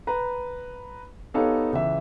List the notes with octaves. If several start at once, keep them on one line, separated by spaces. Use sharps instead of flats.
B4 A#5
B3 D#4 G4 A4 C#5 F5
C#2 E3 E5